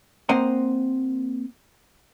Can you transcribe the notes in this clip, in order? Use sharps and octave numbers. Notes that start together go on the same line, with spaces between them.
A#3 C4 C5 D#5 F#5 A#5